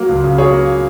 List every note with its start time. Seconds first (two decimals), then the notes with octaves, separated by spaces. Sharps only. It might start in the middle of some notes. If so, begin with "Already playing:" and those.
Already playing: F#3 A#3
0.09 C#2
0.24 C#3
0.38 F#3 G#4 C#5
0.53 A#3